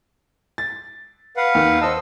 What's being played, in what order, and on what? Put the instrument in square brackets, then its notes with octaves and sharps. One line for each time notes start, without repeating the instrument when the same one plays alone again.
[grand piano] A6
[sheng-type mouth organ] B4 F5 F#5
[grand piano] D#2 D#3
[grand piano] C5 A5 [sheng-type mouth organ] D#5 E6